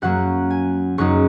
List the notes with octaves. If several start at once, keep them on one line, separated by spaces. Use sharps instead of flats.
F#2 F#3 A#3 F#5
G#5
F#1 F#2 F#3 D#4 C#6